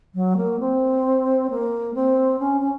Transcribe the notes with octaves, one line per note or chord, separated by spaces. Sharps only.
F#3
A#3
C4
A#3
C4
C#4
C#4